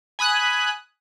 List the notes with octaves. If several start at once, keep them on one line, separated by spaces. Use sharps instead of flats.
G#5 B5 D#6 F#6